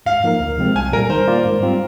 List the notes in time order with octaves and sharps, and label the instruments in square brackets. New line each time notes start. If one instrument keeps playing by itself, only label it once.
[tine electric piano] G#2 [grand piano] F5
[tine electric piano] F3 A#3 D#4 A#4
D2
C3 F3 G#3 C4
[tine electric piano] C2 [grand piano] G#5
[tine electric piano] A#2 G3 [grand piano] A#4
[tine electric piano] D#3 [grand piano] C5
[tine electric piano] A#3 F4 A#4 D5
G#2
G3 C4 F4